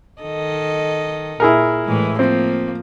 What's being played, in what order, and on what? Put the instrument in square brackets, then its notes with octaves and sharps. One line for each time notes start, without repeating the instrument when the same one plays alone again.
[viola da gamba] D#3 A4 D#5
[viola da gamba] A#2 [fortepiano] E4 G#4 A#4
[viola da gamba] A2 E3 G#3
[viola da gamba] F3 A#3 [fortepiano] C4